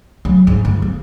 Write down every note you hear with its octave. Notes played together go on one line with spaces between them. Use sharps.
F#3
G#2
G1
A#3